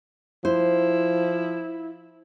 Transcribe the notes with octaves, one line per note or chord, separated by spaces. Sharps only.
F3 E4 C5